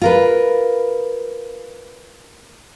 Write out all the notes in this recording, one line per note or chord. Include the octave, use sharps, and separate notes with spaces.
F4 A#4 B4